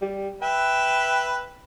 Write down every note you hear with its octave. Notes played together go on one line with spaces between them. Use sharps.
G3
B4 E5 G5